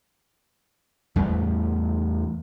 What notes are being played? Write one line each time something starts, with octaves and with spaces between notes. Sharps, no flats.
E2 A2 G3